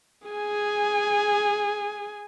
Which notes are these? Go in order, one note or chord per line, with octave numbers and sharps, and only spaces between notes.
G#4 G#5